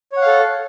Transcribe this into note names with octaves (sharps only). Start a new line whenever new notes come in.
A4 C#5 F5 F#5